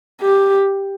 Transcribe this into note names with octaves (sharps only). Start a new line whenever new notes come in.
G4